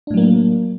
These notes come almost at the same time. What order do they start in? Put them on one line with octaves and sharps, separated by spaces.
D4 A2 F#3 A#3